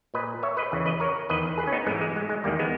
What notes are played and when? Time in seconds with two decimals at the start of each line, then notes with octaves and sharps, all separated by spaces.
0.14 A#2 B4 D#5
0.43 C#5 E5
0.57 B4 D#5
0.72 E2 C#3 E3
0.86 B4 D#5
1.00 A#4 C#5
1.29 E2 D#3 B4 D#5
1.58 G#4 B4
1.67 C#4
1.72 B3 D#4
1.87 G#2 G#3 B3
1.91 E3
2.01 G#3
2.16 G#3
2.29 G#3
2.44 E2 G3 A#3
2.48 D#3
2.59 G#3 B3